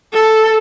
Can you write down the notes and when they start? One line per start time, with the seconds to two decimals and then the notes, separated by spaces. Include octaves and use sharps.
0.14 A4